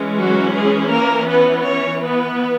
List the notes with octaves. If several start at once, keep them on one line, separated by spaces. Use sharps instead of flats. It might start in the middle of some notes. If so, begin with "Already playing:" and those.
Already playing: E3 G#3 C#4
F#3 F#4
G#3 G#4
A#3 A#4
B3 B4
C#4 C#5
B3 B4